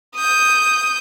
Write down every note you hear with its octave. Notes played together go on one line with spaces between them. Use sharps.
D#6 G6